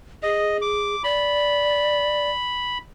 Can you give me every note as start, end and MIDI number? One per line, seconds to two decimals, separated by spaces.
0.23 0.95 68
0.23 0.57 75
0.62 1.03 86
1.04 2.30 74
1.04 2.78 83